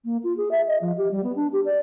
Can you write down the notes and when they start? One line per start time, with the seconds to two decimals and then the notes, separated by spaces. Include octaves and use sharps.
0.05 A#3
0.23 F4
0.37 G#4
0.51 E5
0.67 D#5
0.81 F3
0.97 G4
1.11 G3
1.23 B3
1.36 D4
1.52 G4
1.65 D5